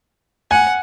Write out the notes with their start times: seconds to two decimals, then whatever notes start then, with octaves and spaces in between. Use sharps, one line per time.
0.51 F#5 G#5